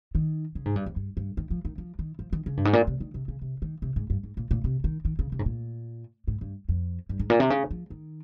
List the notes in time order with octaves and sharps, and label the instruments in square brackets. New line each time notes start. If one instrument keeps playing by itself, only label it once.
[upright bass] D#3
C#3
G#2
G2
F2
G2
G2
D#3
F3
D#3
F3
D#3
F3
D#3
C#3
G2
G#2
A#2
C3
D#3
C3
C#3
C3
D#3
C3
G#2
G2
G#2
A#2
A#2
C3
D#3
D#3
C#3
C3
G#2
A#2
G#2
G2
F2
G2
G#2
A#2
C3
C#3
F3
D#3